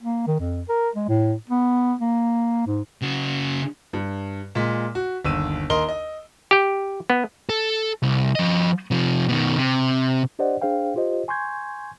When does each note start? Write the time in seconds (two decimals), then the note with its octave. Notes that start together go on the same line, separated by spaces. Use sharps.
0.01 A#3
0.27 D#3
0.40 F2
0.69 A#4
0.95 G#3
1.09 A2
1.50 B3
2.01 A#3
2.67 G#2
3.02 C#3 F#4
3.93 G2
4.55 A#2 G#3 B6
4.95 F#4
5.25 G1 D#2 E6 D#7
5.70 D#2 A#4 D#5 C6 G7
5.89 D#5
6.51 G4 G5
7.10 B3
7.49 A4
8.02 C2
8.35 F3 D#5
8.91 C3 F3
9.28 B2 D#3
9.58 C3
10.39 D4 G4 C5 D5 D#5 F#5
10.62 D4 G#4 C5 F5 G5
10.96 F4 G4 C5 D#5
11.28 G#5 C6 C#6 G6 G#6